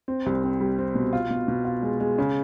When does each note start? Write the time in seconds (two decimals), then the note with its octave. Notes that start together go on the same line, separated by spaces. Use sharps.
0.08 C4
0.26 C2
0.44 C4
0.60 G3
0.78 C4
0.95 B2
1.13 F4
1.30 B2
1.48 B2
1.65 F4
1.82 G#3
2.00 G#3
2.18 C#3